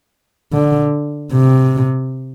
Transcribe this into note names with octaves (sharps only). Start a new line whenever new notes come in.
D3
C3